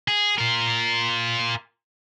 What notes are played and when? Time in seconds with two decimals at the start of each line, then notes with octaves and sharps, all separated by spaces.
0.08 G#4
0.38 F4 A#4